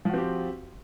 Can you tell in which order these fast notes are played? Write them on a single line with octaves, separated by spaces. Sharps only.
F3 F#4 C4 G4